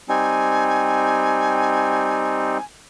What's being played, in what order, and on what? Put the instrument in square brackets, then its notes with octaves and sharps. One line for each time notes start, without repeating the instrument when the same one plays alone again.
[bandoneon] G3 C4 D#4 [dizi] G#5